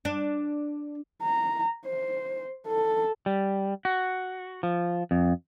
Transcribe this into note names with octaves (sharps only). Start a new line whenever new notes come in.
D4
A#5
C5
A4
G3
F#4
F3
F2